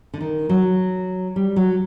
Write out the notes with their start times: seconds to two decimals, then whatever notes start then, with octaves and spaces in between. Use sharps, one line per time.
0.14 D3
0.21 D#3
0.49 F#3
1.36 G3
1.56 F#3